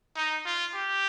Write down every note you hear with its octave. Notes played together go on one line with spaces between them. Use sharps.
D#4
F4
G4